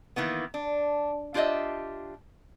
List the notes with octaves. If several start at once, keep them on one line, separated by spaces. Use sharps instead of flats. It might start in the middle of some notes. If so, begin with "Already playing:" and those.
D#3 E3 A#3 B3
D4
D4 F4 G4 C#5 D#5 E5